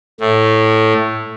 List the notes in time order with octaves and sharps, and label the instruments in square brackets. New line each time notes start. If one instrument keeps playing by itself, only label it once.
[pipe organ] A2